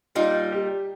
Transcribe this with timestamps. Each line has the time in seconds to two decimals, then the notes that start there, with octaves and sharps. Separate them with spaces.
0.15 A#2 G3 D#4 F4
0.52 G4